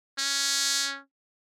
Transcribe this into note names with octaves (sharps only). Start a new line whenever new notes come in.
C#4